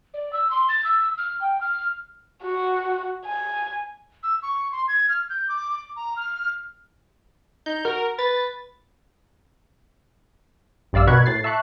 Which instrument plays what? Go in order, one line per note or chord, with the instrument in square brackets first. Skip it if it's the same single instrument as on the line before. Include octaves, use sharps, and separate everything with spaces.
[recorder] D5
E6
C6
A6
E6
F6
G5
F6
[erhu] F#4
G#5
[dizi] E6
C#6
C6
G#6
F6
G6
D6
D6
A#5
F6
[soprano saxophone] D#4 [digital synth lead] G6
[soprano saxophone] F#4 [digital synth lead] A#4
[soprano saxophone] B4 [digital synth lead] A6
[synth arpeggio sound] A#1 G2 D5 F5 E6
B2 A#4 B5 C#6 F#6 G#6
A2 A6 C7
E5 A5 C#6 F#6